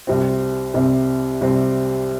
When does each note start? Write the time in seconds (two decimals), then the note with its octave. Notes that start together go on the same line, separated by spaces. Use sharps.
0.07 C2 C3 G3 C4
0.74 C2 C3 G3 C4
1.41 C2 C3 G3 C4